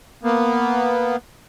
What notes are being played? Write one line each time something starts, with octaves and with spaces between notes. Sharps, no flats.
A#3 B3